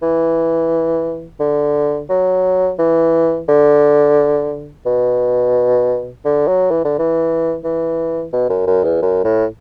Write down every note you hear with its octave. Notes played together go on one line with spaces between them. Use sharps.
E3
D3
F#3
E3
D3
B2
D3
F#3
E3
D3
E3
E3
B2
F#2
F#2
E2
F#2
A2